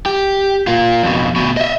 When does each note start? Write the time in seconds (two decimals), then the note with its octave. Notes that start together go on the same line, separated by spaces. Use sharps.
0.06 G4
0.67 A#3 F4
1.03 F2 B2
1.36 D2 B2
1.57 D#5 E5